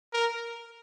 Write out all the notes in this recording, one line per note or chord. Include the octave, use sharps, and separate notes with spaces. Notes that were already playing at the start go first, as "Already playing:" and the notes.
A#4